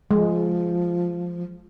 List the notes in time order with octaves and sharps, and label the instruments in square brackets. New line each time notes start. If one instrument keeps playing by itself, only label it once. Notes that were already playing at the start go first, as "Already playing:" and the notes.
[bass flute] F3 [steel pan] G#3